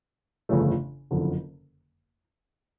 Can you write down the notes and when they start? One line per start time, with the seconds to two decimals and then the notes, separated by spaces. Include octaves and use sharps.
0.49 G1 F2 C#3 E3 A3
1.11 F#1 F2 D3